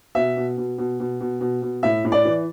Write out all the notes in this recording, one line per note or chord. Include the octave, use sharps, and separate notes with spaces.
B2 E5
B2
B2
B2
B2
B2
B2
B2
A2 E5
A2
D5
E3